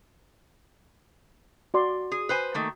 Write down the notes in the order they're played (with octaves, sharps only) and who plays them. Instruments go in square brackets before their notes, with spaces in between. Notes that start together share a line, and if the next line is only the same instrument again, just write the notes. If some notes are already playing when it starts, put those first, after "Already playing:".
[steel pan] F#4 D5 C6
[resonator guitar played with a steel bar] G#4
B4 C5 G#5
D#3 A3 A#3